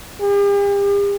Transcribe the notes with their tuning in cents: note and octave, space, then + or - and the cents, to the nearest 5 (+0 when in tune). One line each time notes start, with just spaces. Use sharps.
G4 +45